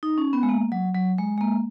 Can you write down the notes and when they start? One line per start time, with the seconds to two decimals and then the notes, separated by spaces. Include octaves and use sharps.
0.03 D#4
0.18 C#4
0.33 B3
0.43 G#3
0.49 A#3
0.72 F#3
0.95 F#3
1.18 G#3
1.38 G#3
1.41 A#3